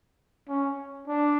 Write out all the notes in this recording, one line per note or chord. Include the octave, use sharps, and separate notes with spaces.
C#4
D4